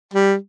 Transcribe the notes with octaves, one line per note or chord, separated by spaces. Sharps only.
G3